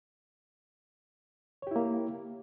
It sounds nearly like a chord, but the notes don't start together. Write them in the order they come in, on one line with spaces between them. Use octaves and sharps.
C#5 G4 E4 A#3